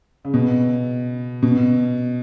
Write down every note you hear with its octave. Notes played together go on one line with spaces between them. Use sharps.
C#3
B2
B2